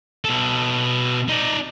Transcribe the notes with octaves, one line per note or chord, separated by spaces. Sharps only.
B2 A4
D#4 D5